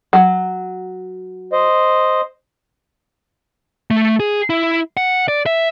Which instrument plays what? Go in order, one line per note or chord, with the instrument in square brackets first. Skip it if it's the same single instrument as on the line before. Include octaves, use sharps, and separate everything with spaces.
[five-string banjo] F#3
[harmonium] C5 D#5
[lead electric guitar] A3
G#4
E4
F#5
D5
E5